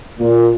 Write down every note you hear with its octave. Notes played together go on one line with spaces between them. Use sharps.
A#2